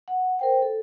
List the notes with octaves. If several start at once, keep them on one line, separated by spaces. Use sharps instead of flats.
F#5
A#4 C5 G5
A4